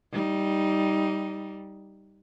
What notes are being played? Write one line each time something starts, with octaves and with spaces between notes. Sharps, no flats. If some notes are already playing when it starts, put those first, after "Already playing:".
G3 D#4